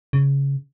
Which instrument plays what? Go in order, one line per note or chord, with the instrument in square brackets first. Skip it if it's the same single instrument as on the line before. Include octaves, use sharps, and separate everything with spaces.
[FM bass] C#3